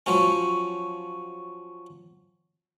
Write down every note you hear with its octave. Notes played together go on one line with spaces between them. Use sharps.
F3 F#3 C#4